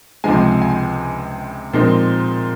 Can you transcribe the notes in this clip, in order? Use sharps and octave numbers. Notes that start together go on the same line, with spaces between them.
C#2 C3 F3 G#3 G#5
G#5
A#2 F3 G#3 C4 D#4